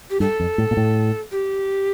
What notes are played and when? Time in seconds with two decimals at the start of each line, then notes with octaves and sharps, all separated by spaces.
0.10 G4
0.20 G2 A4
0.40 F2
0.58 A2
0.71 A#2
0.77 A2
1.32 G4